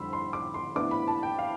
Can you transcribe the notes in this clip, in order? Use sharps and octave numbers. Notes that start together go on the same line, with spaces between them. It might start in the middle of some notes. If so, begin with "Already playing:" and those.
Already playing: F2 D3 G3 D4 B5 C6 E6
C6
D6
C6
A2 E3 B3 D4 D6
B5
A5
G5
F5